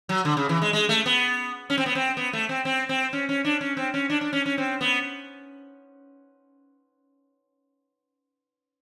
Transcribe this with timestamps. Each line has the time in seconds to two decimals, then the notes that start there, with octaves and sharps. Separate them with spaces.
0.09 F#3
0.25 D3
0.37 C#3
0.49 E3
0.62 G#3
0.73 G#3
0.89 A3
1.06 B3
1.70 C#4
1.78 C4
1.86 B3
1.95 C4
2.17 B3
2.33 A3
2.49 C4
2.65 C4
2.89 C4
3.13 C#4
3.29 C#4
3.45 D4
3.61 C#4
3.77 C4
3.94 C#4
4.10 D4
4.21 D4
4.33 C#4
4.46 C#4
4.58 C4
4.81 B3